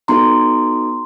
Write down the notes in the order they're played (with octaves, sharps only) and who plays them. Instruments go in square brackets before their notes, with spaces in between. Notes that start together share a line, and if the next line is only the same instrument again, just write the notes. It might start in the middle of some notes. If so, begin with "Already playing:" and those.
[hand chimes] B3 D#4 F#4 A4 A#5 C6